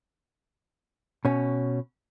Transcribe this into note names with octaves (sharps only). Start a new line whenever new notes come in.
B2 C#4